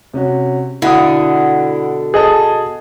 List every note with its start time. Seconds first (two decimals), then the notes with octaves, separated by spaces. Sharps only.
0.14 C3 C#4 F#4
0.82 B2 D3 E4 F#5 D#6
2.14 G#4 A4 D#5 A5